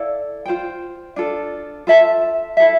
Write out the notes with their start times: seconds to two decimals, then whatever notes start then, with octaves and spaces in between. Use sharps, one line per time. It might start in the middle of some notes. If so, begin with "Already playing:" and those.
Already playing: E4 A4 D5 F5
0.46 F4 C5 G5
1.16 D4 F4 A4
1.87 F4 A4 E5 A5
2.57 E4 A4 E5